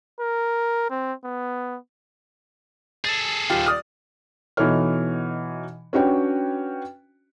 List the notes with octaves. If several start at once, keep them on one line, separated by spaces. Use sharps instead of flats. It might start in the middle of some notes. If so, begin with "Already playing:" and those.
A#4
C4
B3
G#4 A4 A6
D#1 F4 G4
D5 D#6 F6
B2 E3 D#4 A4 C#5 F6
C#4 D4 F#4 B4 C#5 G5